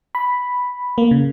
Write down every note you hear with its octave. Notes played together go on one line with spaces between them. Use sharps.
B5
A#3
C#3